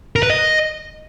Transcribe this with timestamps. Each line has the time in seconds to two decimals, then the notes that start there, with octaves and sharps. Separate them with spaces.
0.16 A#4
0.23 B4
0.30 D#5